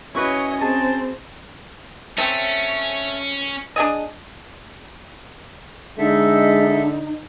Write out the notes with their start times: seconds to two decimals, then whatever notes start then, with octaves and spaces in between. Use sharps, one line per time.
0.15 C#4 E4 F#4 B4 C#5 D#5
0.61 C4 G#4 A5
2.18 A3 C4 C#4
3.76 D4 G#4 D#5
5.98 D3 G#3 D#4 A4 E5